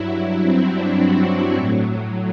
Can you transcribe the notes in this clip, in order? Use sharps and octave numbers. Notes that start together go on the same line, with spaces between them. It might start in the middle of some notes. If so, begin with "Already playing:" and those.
Already playing: G2 F#3 E4
C4
D4
F#4
A2 F#3